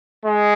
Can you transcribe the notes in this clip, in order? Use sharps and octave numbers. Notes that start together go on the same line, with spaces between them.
G#3